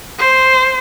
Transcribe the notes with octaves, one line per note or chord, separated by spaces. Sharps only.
C5